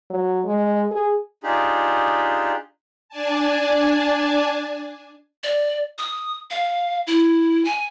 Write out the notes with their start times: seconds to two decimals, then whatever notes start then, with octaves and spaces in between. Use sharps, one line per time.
0.10 F#3
0.45 G#3
0.91 G#4
1.43 D4 D#4 F4 G4 G#4
3.09 D4 D5 G#5 A5
5.43 D5
5.98 D#6
6.51 F5
7.07 E4
7.65 G#5